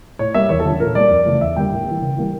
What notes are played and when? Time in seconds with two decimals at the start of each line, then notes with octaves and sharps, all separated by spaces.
0.19 A2 C#5
0.34 G3 A#3 E5
0.49 E2 C#5
0.60 A4
0.65 D3 F3 C#4
0.80 A#2 A#4
0.95 G3 A#3 D5
1.10 F2
1.26 C#3 E3 A3
1.41 E2 E5
1.56 D3 G3 A#3 G5
1.72 A2
1.87 E3 A#3
2.02 C#3
2.17 E3 G3 A#3